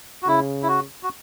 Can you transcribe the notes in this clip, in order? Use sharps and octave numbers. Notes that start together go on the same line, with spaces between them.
F#4
C#3 E4
E4
F#4
F#4